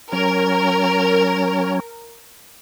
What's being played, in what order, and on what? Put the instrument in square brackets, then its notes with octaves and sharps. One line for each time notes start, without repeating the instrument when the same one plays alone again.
[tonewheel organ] F#3 C#4 [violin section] A#4